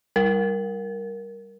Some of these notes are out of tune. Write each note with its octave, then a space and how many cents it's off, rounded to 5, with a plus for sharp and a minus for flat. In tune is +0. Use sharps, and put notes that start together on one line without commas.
G3 +0 A#4 +5